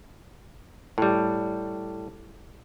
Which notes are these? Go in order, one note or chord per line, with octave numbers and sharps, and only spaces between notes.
A2 G3